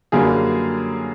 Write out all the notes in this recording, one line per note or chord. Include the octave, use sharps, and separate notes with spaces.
F#2 D3 G3 A#3 G#4